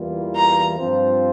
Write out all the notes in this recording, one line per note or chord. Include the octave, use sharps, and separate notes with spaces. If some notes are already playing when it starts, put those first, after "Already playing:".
Already playing: E2 E3 G3 A#3 F4
A#5
G2 F3 C4 F4 C5